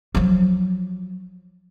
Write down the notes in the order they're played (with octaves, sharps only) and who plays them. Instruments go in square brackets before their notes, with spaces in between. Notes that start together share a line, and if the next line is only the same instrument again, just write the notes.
[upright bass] F3 F#3